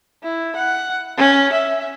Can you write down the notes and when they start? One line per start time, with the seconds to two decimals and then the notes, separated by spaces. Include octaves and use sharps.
0.23 E4
0.56 F#5
1.18 C#4
1.53 E5